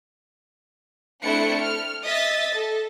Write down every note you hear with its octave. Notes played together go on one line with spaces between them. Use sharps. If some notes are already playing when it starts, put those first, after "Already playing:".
A3 C4 D4 E4 F#6 C#7
F6
D#5 E5 D#6 A6 B6
A4